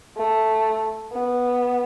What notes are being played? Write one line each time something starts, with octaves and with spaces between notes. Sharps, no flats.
A3
B3